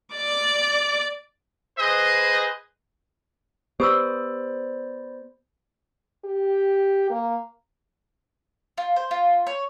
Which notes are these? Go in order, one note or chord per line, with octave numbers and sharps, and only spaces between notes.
D5 D6
G#4 B4 C5 D#5
B3 G4 C5 D5 B5 D#6 E6
G4
A#3
F4
C5
F4
C#5